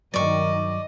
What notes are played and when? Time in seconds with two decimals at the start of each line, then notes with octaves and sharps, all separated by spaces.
0.14 G2 D#3 F#3 D5 D#5 C#6